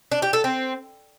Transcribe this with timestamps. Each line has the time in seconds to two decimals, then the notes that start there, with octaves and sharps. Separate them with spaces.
0.12 D4
0.22 G4
0.33 A4
0.44 C4